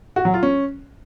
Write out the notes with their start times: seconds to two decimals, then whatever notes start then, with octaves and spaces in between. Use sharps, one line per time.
0.16 F#4
0.25 F#3
0.34 F4
0.43 C#4